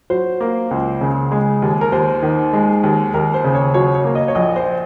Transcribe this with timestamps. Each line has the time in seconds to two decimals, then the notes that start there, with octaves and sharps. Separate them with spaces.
0.10 F#3 C5
0.41 A#3
0.71 C#2
1.01 C#3
1.32 G#3
1.62 D#2
1.81 A#4
1.92 D#2 C5
2.23 D#3
2.53 G#3
2.83 D#2
3.14 D#2 A#4
3.34 C5
3.44 C#3
3.54 C#5
3.74 F#3 C#5
3.95 C#5
4.05 A#3
4.15 D#5
4.28 C#5
4.35 A#1 D#5
4.56 C5